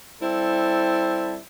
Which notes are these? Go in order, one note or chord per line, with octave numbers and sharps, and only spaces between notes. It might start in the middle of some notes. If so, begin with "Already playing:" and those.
G3 C4 E4 A4